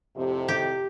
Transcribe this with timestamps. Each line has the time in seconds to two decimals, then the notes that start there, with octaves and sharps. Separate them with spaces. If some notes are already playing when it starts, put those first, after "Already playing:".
0.16 F2 A2 C3
0.48 G4